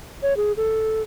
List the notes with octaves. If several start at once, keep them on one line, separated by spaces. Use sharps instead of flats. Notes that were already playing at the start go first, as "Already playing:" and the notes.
C#5
G#4
A4